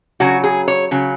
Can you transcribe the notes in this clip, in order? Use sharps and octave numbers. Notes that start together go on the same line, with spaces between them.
C#3 F#3 F#4
G#4
C#5
C#3 F#3